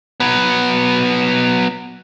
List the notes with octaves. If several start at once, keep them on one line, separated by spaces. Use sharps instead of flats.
F#3 B3